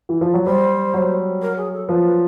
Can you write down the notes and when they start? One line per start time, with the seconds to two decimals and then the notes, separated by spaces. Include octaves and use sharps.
0.09 E3
0.21 F3
0.34 F#3
0.46 G3 C5
0.94 F#3
1.42 A#4
1.57 G#4
1.73 A4
1.88 F3 B4
2.05 B4